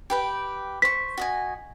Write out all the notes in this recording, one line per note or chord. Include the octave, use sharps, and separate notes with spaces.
G4 B4 G5
C5 C#6 B6
F#4 D#5 G#5